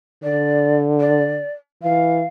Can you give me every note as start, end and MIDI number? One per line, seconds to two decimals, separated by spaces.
0.23 1.44 50
0.23 0.79 74
1.00 1.51 74
1.83 2.23 52
1.83 2.26 77